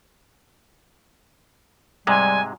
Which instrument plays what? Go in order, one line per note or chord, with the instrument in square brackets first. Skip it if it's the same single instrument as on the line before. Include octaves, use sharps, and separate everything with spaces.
[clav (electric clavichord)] G#2 C3 G#3 [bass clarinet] G3 [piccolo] G#5